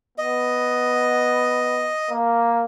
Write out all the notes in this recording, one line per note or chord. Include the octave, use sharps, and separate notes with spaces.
B3 D#5
A#3